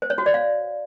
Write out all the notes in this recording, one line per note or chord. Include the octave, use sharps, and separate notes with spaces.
C5
C#5
F#4
D5
F5